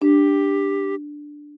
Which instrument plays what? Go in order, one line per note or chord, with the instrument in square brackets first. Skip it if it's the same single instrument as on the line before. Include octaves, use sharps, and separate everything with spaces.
[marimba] D4 [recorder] G4